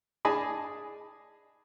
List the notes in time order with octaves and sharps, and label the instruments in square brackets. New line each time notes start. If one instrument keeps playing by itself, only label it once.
[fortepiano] D4 G#4 D#5 G#5 A5 B5